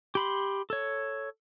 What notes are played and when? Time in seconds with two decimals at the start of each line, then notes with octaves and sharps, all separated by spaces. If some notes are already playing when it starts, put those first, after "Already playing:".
0.15 G4 B5 C6
0.70 A4 C#5